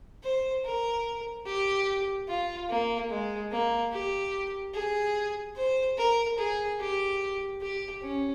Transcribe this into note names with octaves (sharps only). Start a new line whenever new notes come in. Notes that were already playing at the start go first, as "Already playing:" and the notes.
C5
A#4
G4
F4
A#3
G#3
A#3
G4
G#4
C5
A#4
G#4
G4
G4
C#4